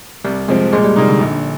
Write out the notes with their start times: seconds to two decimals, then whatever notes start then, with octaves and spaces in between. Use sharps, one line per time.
0.25 C2 G3
0.48 C3 F3 G#3 C4
0.73 A#2 G#3
0.84 G3
0.96 C3 G3 A#3 D#4
1.08 D3
1.20 A#1